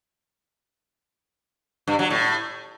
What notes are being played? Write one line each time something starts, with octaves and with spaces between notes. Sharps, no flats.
G2
F#3
A2